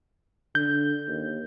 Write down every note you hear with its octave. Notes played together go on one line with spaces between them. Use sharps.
D3 G6
D#2